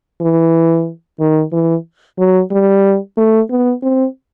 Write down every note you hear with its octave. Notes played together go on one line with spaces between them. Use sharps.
E3
D#3
E3
F#3
G3
A3
B3
C4